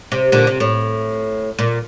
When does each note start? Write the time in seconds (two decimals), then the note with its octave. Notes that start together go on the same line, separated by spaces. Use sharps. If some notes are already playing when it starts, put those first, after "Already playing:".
0.12 C3
0.32 A#2 D3
0.47 C3
0.60 A2
1.59 A#2